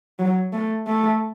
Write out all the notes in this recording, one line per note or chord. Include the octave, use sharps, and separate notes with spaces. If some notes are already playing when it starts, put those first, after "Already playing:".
F#3
A3
A3